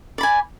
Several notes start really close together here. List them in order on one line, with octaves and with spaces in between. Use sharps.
D5 B5 G#5